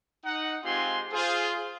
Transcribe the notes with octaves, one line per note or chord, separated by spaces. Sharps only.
D#4 F#5
G#3 C4 F4 G4 G#5 C6
F4 G#4 C5